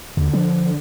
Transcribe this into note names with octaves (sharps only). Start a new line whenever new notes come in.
D#2 D3
F3